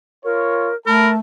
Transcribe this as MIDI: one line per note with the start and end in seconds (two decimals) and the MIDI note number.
0.25 0.71 65
0.25 0.75 70
0.25 0.71 73
0.86 1.17 57
0.86 1.11 70
0.86 1.15 81
0.86 1.09 83